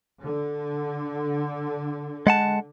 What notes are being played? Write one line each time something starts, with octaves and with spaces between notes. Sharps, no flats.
D3
G#3 F#5 A5